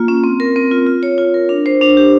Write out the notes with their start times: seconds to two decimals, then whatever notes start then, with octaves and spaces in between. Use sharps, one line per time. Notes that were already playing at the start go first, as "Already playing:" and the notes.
Already playing: A#3 F4
0.08 C#4
0.24 C4
0.40 A#4
0.56 C4
0.71 F4
0.87 F4
1.03 C#5
1.18 F4
1.34 A#4
1.49 D4
1.66 C5
1.81 D4
1.97 G4